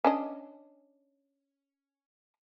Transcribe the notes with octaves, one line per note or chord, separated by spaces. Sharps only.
C#4 D4 D#5